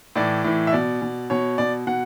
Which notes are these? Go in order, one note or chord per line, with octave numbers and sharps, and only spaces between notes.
A2 E3 D5
A2 E3
E5
B2 D5
B2
B2 C#5
B2 D5
B2 F#5